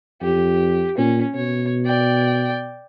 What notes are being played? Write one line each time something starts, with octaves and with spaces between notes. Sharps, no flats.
F2 G4
A#2 C#4
B2 C#5
D5 G5